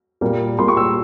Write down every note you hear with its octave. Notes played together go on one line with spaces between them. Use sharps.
A#2 G3 A#3
A#2 G3 A#3 C6
C#6
E6